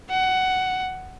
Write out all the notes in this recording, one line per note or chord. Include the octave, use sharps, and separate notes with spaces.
F#5